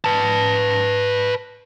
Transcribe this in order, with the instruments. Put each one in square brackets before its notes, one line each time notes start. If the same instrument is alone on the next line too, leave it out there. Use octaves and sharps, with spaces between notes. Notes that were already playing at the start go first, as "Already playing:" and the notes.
[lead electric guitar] B4 A5